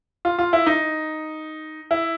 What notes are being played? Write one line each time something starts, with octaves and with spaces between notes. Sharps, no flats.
F4
F4
E4
D#4
E4